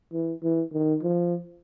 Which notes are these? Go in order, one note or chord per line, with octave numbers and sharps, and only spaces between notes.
E3
E3
D#3
F3